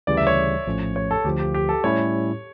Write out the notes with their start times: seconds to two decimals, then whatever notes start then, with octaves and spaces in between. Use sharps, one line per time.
0.07 D2 C#3 E3 G3 D5
0.17 E5
0.27 C#5
0.66 A#1 A2 F3 A3 C#4
0.96 C#5
1.11 A4
1.24 D2 D3 F3 G4
1.40 G4
1.54 G4
1.69 A4
1.84 A2 G3 C#4 E4 C#5